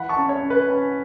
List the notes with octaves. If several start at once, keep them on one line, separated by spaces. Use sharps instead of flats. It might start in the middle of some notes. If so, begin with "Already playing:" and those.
Already playing: E3 F#5 B5
A5 C#6
C#4
C#5
C#4
B4
C#4